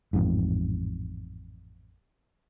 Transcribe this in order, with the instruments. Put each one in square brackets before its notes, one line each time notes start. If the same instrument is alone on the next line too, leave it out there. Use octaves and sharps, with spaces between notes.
[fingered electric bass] A1 F2 G#2